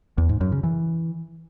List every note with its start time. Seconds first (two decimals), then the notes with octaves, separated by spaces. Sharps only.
0.18 E2
0.29 G#2
0.41 F#2
0.52 C#3
0.64 E3